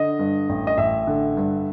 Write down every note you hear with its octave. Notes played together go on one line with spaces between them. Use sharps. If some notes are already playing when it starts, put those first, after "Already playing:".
Already playing: D3 D#5
G2
A1
D#5
A1 E5
D3
G2